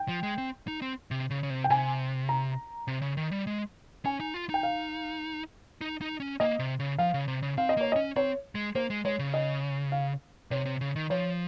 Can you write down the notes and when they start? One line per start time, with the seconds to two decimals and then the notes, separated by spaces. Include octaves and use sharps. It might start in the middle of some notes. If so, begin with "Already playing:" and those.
Already playing: G5
0.08 F3
0.23 G#3
0.38 C4
0.68 D#4
0.82 C4
1.11 C3
1.30 C#3
1.43 C#3
1.50 C3
1.64 G5
1.70 C3 G#5
2.29 A#5
2.88 C3
3.02 C#3
3.17 D#3
3.31 G3
3.47 G#3
4.05 C#4 G#5
4.20 D#4
4.34 F4
4.50 D#4 G5
4.63 F5
5.81 D#4
6.01 D#4
6.20 C#4
6.40 A#3 D#5
6.59 C3
6.80 C#3
6.98 F3 F5
7.14 C#3
7.28 C3
7.43 C#3
7.58 C4 F5
7.69 D#5
7.77 A#3 C#5
7.92 D#5
7.96 C#4
8.16 C4 C#5
8.55 G#3
8.75 A#3 C5
8.90 G#3
9.05 G#3 C#5
9.19 C#3
9.34 D#5
9.92 F5
10.51 C3 C#5
10.65 C3
10.81 C#3
10.96 D#3
11.10 F3 C#5